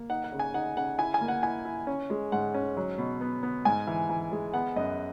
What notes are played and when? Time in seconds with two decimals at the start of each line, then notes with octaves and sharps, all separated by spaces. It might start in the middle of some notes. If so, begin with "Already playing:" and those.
Already playing: A#3
0.10 D#4 F#5
0.24 F#5
0.32 C#3
0.39 G#5
0.54 D#4 F#5
0.77 C#3 F#5
0.98 E4 G#5
1.14 G#5
1.21 A#3
1.28 F#5
1.43 E4 G#5
1.65 E4
1.87 C#4
2.10 G#3
2.32 G#2 F#5
2.54 C#4
2.77 F#3
2.98 B2
3.21 B3
3.43 B3
3.65 G#2 G#5
3.87 E3
4.09 E3
4.32 G#3
4.54 B3 F#5
4.76 F#2 D#5